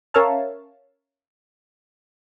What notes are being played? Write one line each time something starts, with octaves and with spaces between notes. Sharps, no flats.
C#4 A#4 C#5 E5 F5 A5